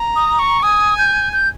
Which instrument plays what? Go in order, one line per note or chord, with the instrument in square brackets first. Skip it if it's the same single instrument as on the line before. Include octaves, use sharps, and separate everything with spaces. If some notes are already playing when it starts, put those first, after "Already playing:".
Already playing: [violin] A#5
[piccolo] D#6
C#6
[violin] G#5 [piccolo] D#6
[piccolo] G6
G6